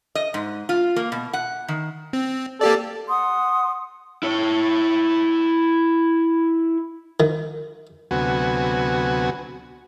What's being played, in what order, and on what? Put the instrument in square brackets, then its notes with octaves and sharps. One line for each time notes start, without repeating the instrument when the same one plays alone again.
[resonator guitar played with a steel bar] D#5
G#2
F4
A#3
B2
F#5
D#3
[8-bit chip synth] C4
[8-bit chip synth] A#3 G4 D5 [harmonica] A4
[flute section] F#5 C6 D#6
[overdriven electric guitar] E4 C#5
[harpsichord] D#3
[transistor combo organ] D2 C3 F#3 B3 F#4 G#5